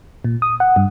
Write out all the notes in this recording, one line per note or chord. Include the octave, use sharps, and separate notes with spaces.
A#2
D#6
F#5
G2